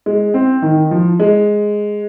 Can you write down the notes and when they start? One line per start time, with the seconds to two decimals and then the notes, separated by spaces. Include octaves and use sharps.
0.06 G#3
0.34 C4
0.62 D#3
0.91 F3
1.20 G#3